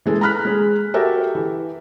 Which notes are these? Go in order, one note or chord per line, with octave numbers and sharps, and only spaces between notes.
E3 G#3 A4
A#5 B5 F6 F#6 B6
G#3 G#4
F#4 G4 A4 A#4 E5
E3